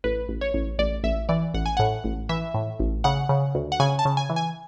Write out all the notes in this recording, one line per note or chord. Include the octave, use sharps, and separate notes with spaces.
A1 B4
A1
C#5
A1
A1 D5
A1 E5
E3 D5
A1 F#5
G#5
A2 F#5
A1
E3 E5
A2
A1
C#3 F#5
C#3
D2
F#5
C#3 G#5
A5
C#3
G#5
E3
G#5